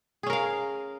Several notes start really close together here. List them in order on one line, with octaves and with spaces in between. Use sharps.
G#4 C#4 A#4 F5